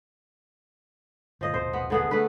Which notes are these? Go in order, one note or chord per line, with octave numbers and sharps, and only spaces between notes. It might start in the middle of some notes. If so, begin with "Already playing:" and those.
G1 A#2 F3 D#5
D#1 G#1 B2 C5
B3
D3 B3 G#4
A3 D4 B4